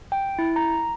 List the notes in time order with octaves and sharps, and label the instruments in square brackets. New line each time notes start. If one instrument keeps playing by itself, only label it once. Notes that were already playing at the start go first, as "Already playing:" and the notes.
[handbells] G5
E4
A#5